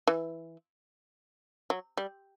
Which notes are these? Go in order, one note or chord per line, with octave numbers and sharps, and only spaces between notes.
E3
F#3
G3